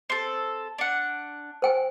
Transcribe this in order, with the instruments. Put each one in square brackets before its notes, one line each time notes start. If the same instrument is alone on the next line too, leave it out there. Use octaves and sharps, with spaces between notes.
[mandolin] C4 A4
D4 F#5
[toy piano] C5 G5 G#5